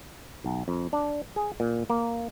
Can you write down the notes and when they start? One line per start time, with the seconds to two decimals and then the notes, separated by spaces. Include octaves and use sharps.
0.44 B1
0.68 F2
0.93 D4
1.36 G#4
1.60 A#2
1.90 A#3